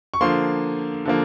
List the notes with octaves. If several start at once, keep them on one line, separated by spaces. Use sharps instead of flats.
C#6
D3 F3 A#3 C6
D3 F3 A#3